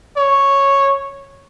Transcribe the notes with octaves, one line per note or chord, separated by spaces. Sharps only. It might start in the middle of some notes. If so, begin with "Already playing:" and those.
C#5